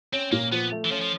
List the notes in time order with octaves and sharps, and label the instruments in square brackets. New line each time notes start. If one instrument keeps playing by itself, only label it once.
[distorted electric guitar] C4 [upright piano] C#4
[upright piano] A#2 [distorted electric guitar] A#3
[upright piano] F3 [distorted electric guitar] B3
[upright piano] A3
[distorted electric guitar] E3
[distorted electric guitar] F3 [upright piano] C#4
[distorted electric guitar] F3